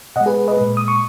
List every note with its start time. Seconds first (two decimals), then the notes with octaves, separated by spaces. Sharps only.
0.16 B2 D#5 F#5
0.20 G#3
0.26 G#4 B4
0.48 B4 D#5
0.57 A#2 G#3
0.77 D#6
0.88 C#6